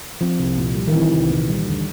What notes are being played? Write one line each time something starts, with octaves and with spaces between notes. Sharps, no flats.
F3 C4
C2
A#2
G3
D#3
E3 C4
C2
A#2
G3
D2